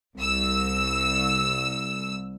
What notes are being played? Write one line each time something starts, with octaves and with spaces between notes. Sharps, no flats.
C2 E6